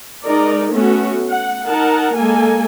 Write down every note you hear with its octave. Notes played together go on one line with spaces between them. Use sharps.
G#3 D#4 A#4 D5
A3 B3 C#4 F#4
F#5
D#4 A#4 F#5 A5
G#3 A#3 A4 G#5